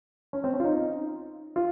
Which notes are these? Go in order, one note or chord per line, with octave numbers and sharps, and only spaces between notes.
C#4
C4
C#4
F4
D#4
F4